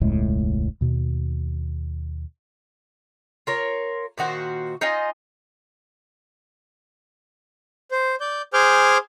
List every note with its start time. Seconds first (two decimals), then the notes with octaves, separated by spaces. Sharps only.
0.01 E1 C#2 A2 G#3
0.81 D#2 B2
3.47 F4 A#4 C#5
4.18 A#2 D#3 F#4 C5
4.81 D#4 F4 D#5 G#5
7.91 C5
8.20 D5 G6
8.53 G#4 C5 G#5 D6 F6 G6